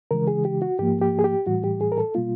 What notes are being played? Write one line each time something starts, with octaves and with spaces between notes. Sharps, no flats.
C#3 E3 G#3 A#4
G#4
G4
F#4
G#2 F3 A#3 G4
G4
G#4
G4
A2 E3 G3 F#4
G4
G#4
A#4
A4
B2 G3 A#3 F4